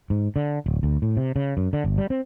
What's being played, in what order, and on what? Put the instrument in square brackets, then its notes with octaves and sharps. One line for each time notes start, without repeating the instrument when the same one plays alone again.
[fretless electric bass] G#2
D3
D1
D2
A2
C3
C#3
F#2
D3
G1
G3
C4